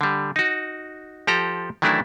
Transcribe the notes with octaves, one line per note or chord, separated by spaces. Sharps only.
D3 G3
D#4 F#4
F3 G4 A4 A#5
D#3 E3 F#3 A3 D4 E4